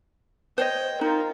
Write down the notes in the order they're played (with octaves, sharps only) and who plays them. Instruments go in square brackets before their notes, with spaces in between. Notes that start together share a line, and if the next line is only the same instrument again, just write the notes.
[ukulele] C5 C#5 D#5 [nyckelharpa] G5
[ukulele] D#4 [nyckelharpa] F4 A#4